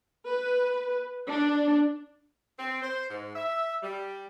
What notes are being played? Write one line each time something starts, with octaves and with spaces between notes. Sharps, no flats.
B4
D4
C4
C5
G#2
E5
G3